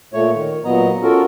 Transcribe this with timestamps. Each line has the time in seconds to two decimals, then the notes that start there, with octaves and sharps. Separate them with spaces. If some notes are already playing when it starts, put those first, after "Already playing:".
0.13 A#2 A3 C#5
0.34 D#3
0.65 A#2 F#3 B3 D#5 A#5
1.02 C#4 F4 F#4 A4 A#4